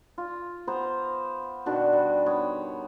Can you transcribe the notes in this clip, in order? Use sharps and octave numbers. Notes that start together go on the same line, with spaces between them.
F4
B3 C5 A#5
B2 D#3 D4 F#4
G3
B3 C#5